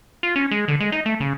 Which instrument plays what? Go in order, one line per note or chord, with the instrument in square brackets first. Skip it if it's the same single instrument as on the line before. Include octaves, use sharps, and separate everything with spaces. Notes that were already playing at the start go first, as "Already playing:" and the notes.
[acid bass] F4
C#4
G#3
D3
G#3
D#4
A3
C#3